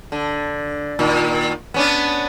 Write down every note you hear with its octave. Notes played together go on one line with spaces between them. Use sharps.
D3
A#2 D#3
B3 C#4 D4